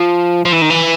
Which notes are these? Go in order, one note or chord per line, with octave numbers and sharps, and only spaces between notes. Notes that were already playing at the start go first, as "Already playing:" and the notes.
Already playing: F3
F3
E3
D#3
E3